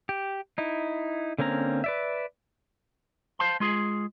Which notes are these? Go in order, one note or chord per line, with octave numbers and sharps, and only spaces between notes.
G4
D#4 E4
D3 A#3 C4 C#4 A#5
B4 D5 E5
C5 F5 A5 C6
G#3 F4 G#4